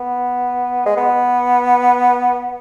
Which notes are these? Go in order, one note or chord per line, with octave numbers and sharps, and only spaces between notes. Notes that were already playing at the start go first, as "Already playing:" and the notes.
Already playing: B3
G#3
B3